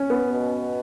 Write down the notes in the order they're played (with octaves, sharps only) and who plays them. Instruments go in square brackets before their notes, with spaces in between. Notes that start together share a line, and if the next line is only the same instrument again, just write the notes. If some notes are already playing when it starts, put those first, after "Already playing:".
Already playing: [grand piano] C#4
B3
[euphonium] B2